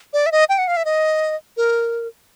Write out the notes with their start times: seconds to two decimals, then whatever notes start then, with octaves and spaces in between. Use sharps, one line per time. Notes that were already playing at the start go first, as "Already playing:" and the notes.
0.13 D5
0.26 E5
0.32 D#5
0.49 G5
0.58 F#5
0.67 F5
0.77 E5
0.85 D#5
1.57 A#4